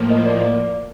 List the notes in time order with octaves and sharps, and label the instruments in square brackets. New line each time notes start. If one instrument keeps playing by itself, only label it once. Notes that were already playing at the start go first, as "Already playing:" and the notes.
Already playing: [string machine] A2 F3 A#3
[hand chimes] D#5
D5
D5